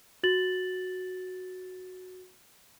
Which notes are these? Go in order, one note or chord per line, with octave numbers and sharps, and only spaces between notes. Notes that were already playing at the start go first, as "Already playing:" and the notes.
F#4 A6 F#7